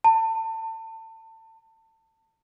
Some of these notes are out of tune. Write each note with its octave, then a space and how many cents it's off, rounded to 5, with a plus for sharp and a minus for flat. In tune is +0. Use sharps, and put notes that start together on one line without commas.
A5 +30